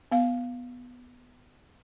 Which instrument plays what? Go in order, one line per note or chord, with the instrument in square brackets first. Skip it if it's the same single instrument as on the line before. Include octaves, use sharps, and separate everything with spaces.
[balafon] B3 F5